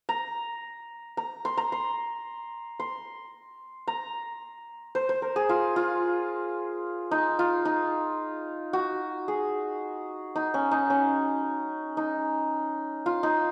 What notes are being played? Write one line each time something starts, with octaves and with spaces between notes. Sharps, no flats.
A#5
A#5
C6
A#5
C6
C6
A#5
C5
C5
A#4
G#4
F4
F4
D#4
F4
D#4
F#4
G#4
D#4
C#4
D#4
C#4
D#4
F4
D#4